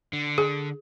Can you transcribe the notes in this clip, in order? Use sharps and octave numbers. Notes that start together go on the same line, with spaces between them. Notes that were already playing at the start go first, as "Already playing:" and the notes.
D3
G#4